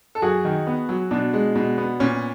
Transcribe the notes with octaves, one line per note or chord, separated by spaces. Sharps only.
A4
F#2 F#4 G#4
D#3
B3
F#3
B2 D4
G#3
B2
B3
A#2 C#4